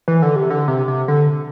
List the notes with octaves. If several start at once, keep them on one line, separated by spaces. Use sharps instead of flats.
E3
D3
C3
D3
C3
C3
D3